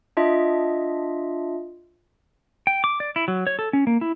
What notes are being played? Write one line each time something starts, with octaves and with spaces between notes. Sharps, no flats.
D4 F4 D#5 E5
G5
D6
D5
E4
F#3
C#5
A4
C#4
A#3
E4